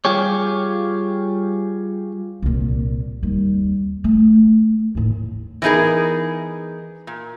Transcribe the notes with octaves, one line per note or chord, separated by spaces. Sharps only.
G3 F4 G4 G#4 C#5
C2 A#2
D#2 G3
A3
D#2 A2
E3 F#3 B3 D#4 G#4 A#4
A#2